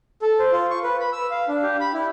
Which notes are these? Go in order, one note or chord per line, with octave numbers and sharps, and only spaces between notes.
A4
C5
F4
C#6
B4
B5
E6
F5
D4
G4
B5
E4